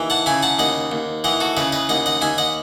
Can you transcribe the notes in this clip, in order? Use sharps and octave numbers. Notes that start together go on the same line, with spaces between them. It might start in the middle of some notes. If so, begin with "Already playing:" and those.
Already playing: D#2 E3
F#5 A5
C#3 E5 G#5
F#5 A5
D#2 D#5 F#5
D#2
E3 D#5 F#5
F#4 A4
C#3 B4 D#5
B4 D#5
D#2 D#5 F#5
D#5 F#5
D#2 E5 G#5
D#5 F#5